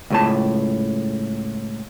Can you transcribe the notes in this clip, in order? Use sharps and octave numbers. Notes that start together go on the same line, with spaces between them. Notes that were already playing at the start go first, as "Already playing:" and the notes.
C#2 A2 A5